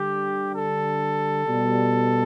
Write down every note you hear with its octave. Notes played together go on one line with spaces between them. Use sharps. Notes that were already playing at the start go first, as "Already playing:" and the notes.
Already playing: D3 G3 G4
A4
B2 G3